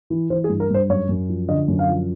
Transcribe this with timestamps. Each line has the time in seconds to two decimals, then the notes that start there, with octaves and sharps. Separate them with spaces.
0.10 E3
0.30 E3 C5
0.44 G#4
0.49 G2
0.60 A#4
0.70 G2 C5
0.89 F#2 C#5
1.09 F#2
1.29 F3
1.48 D3 D#5
1.68 F#2
1.79 F5
1.89 F3